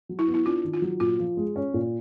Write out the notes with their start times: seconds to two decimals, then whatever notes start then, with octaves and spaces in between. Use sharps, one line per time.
0.09 F#3
0.19 E4
0.28 B3
0.34 E4
0.46 D4 F4
0.64 D#3
0.74 F4
0.82 F#3
1.00 A#2 F4
1.19 F3
1.37 G#3
1.56 C#4
1.74 A#2